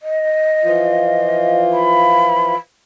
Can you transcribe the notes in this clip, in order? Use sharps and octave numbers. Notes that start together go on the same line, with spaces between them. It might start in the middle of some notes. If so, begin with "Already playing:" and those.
D#5
E3 F3 F4
B5